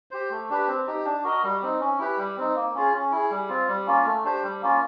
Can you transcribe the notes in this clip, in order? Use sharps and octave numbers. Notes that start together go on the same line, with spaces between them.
G4 C5
A3
D4 G4 B4
C4
D#4 G4
D4
F#4 A#4 D#5
G3
C4 D#4
C#4
E4 G4 B4
G3
C4 D#4
A#3
C#4 F4 G#4
C#4
E4 G#4
G3
C4 F4
G3
A#3 C#4 F4
A3
D4 G4 C5
G3
A#3 C#4 F4